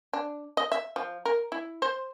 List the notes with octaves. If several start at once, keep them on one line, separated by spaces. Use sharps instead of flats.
D4
D#5
E5
F3
A#4
E4
C5